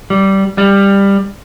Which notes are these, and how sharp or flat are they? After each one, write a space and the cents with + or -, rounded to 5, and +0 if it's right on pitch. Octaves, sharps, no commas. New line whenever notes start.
G3 -15
G3 +15